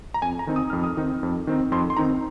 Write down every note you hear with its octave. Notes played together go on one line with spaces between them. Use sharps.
A#5
F2 G#5
A#5
D#3 C4 D#4
D#6
F2 F6
D#6
D#3 C4 D#4
F2
D#3 C4 D#4
F2 C6
C6
D#3 C4 D#4 A#5